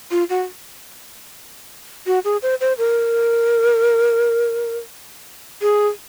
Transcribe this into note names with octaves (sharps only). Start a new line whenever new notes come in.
F4
F#4
F#4
G#4
C5
C5
A#4
G#4